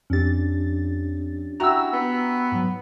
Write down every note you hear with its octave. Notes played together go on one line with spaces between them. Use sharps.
F2 C#4 D4 G4 A6
E4 F#4 G5 A#5 E6
B3
G#2 F#3